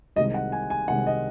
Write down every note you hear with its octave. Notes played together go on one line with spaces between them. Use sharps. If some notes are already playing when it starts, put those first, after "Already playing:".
C2 C3 D#3 G#3 D#5
F#5
G#5
G#5
C2 C3 D#3 G#3 F#5
D#5